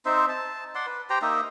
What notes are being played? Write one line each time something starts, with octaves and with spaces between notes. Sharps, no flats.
C4 D#4 C5 E5
A5
D5 F#5 C6
B4
G4 C5 G5 A#5
A#3 D#4 D#5 E5